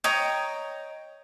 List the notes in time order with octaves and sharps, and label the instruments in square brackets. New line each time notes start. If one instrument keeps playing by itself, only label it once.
[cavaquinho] C#5 D#5 G5 A#5